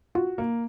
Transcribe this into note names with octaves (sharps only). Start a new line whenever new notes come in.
F4 F#4
A#3